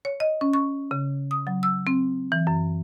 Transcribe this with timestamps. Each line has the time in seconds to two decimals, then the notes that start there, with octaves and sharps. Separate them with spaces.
0.05 C#5
0.20 D#5
0.41 C#4
0.53 C#6
0.91 C#3
1.31 D#6
1.47 F#3
1.63 E6
1.87 C4
2.32 E3
2.47 F#2